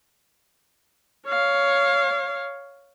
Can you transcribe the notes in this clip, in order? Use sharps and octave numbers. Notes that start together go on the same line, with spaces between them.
C#5 F5